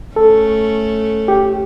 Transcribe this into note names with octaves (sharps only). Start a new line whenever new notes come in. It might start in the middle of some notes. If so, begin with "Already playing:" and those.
A3 C#4 A4
G4